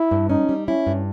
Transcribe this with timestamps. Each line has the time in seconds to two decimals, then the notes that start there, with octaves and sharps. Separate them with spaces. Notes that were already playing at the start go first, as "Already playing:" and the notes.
Already playing: E4
0.11 G2
0.30 C#4 D#4
0.49 G3
0.67 C#4 E4
0.87 G2